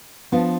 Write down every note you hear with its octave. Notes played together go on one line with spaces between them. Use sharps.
F3 B3 D4 F4